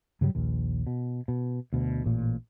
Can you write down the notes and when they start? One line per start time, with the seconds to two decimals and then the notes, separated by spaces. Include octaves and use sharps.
0.21 G2 C#3 F#3 G3
0.35 A#1 D#2
0.87 B2
1.28 B2
1.73 D2 B2
2.04 A1 A#2